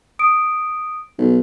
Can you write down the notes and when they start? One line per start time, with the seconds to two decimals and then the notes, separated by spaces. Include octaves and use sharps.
0.19 D#6 D7
1.19 B1